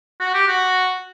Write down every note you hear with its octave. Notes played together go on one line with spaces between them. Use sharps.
F#4
G4
F#4